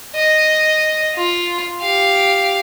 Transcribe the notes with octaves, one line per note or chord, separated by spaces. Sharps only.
D#5
F4
G4 F5